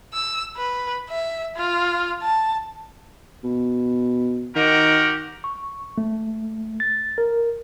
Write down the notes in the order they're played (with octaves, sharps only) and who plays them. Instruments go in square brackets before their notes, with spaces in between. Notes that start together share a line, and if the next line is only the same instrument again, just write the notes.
[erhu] E6
B4
E5
F4
A5
[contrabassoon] B2
[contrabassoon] D#3 [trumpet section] F#4 G4 A#4
[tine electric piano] C#6
A3
A6
A#4